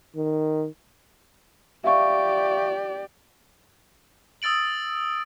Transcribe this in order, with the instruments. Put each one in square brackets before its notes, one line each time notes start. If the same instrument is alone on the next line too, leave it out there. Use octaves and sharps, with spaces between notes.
[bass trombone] D#3
[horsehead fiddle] G4 D5 [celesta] E5 F5 C#6
[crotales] D#6 E6 A6 D7 F#7